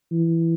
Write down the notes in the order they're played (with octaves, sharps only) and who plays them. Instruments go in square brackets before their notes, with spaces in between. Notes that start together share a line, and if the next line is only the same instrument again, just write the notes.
[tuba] E3